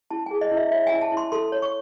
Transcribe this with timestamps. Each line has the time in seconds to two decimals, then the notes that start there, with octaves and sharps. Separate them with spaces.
0.11 E4 A5
0.26 G#4 G#5
0.41 D#5
0.51 E4
0.57 E5
0.71 C#5 E5
0.87 G#5
0.92 E4
1.01 A5
1.12 E4
1.17 C6
1.32 A4 C6
1.52 C#5
1.62 C#6